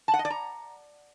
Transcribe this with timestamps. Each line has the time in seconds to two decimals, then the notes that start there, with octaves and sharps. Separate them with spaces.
0.08 A5
0.14 F#5
0.19 D#5
0.25 D5
0.30 A#5